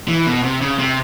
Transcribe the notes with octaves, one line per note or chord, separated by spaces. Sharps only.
E3
B2
C3
C#3
C3